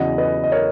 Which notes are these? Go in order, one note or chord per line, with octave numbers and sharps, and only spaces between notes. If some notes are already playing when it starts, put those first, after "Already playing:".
Already playing: E2 C#3 F#3 D#5 F#5
B4 D#5
D#5
A#4 C#5